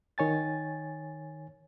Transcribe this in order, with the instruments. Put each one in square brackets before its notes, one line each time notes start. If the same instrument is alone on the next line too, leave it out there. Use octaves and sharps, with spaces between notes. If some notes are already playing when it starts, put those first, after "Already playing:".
[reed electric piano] D#3 C#5 G#5 A6